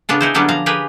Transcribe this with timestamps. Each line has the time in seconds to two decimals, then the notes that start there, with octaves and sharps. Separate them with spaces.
0.09 C#3 B3 D4 F4
0.21 D#4 E4 C5
0.34 D3 F#3 G3 B3 C#4 D4
0.48 F3 F5 A#5
0.66 G4 G#4 A#4 B4